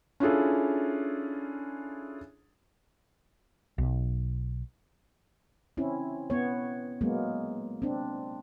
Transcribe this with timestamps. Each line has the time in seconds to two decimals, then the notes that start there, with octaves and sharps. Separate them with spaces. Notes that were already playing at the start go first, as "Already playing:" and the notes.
0.20 C#4 D4 E4 F4 G#4 A4
3.78 B1
5.77 C4 C#4 E4
6.30 B3 C#5
7.01 F#3 G#3 A#3 B3
7.82 C4 D4